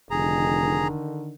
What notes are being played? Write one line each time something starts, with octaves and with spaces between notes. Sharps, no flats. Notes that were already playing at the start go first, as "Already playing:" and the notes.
F1 D3 D#3 G#4 A#5